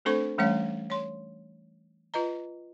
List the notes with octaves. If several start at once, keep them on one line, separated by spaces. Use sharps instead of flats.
A3 C4 D4 A4 C5 C#6
E3 G3 A3 C#4 C#5 F5
C#5 C6
F4 B4 D#5 A#5